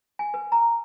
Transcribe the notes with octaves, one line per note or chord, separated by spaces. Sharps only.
G#5
B4
A#5